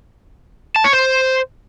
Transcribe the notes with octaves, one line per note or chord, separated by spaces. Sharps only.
A5
C#5
C5